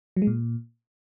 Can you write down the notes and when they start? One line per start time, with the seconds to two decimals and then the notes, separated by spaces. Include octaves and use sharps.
0.17 F#3
0.22 G#3
0.27 A#2